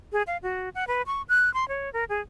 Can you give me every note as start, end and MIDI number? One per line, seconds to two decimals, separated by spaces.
0.12 0.22 68
0.27 0.37 77
0.43 0.69 66
0.75 0.85 78
0.88 1.02 71
1.07 1.22 85
1.29 1.52 90
1.54 1.67 84
1.68 1.92 73
1.93 2.04 70
2.09 2.21 68